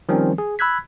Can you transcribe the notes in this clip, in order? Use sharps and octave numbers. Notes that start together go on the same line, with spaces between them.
D#3 F3 G3 C4 C#4
G#4
B5 E6 F#6 G#6 B6